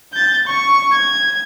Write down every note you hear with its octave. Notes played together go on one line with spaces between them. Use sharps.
G6 A6
C#6
G#6